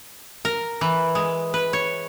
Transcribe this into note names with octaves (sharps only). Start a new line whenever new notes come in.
A#4
E3
G#3
B4
C#5